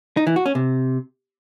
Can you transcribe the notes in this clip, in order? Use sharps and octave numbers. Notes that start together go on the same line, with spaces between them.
D#4
E3
F#4
C#4
C3